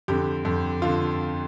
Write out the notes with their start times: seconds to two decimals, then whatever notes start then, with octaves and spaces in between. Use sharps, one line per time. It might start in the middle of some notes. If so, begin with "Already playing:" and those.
0.08 F2 D3 G4
0.45 F2 D3
0.82 D3 F4